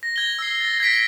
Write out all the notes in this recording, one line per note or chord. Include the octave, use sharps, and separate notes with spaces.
A#6
G#6 G7
E6 C7
A6 A#6
G#6 A#6 B6 D7